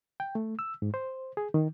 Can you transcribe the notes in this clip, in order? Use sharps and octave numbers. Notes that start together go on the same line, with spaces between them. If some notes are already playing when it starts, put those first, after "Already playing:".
G5
A3
E6
G#2
C5
G#4
D#3